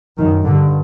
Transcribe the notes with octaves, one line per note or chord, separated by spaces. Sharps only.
F#2 D#3
G2 D3